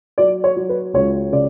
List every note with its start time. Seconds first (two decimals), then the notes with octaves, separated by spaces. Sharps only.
0.18 F#3 D5
0.44 C#5
0.56 F#3
0.69 B4
0.94 C#2 C#5
1.32 C#3 D5